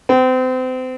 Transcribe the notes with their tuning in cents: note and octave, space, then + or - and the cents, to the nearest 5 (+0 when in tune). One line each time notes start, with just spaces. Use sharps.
C4 -35